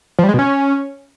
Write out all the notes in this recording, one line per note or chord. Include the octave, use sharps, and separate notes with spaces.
F3
G3
G#3
B2
C#4